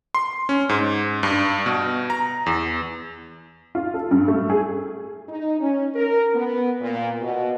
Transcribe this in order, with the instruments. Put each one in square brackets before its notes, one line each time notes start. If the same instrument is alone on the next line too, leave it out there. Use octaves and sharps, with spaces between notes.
[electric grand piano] C6
C#4
G#2
G2
B2
A#5
E2
[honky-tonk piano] F4
A4
G2
A3
G#4
[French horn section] D#4
C#4
A#4
B3
A#2
B2